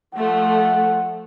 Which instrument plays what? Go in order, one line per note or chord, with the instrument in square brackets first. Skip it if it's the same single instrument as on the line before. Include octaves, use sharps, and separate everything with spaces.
[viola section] F3 A3 [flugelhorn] F#5